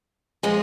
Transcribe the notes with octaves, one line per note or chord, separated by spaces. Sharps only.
F3 G#3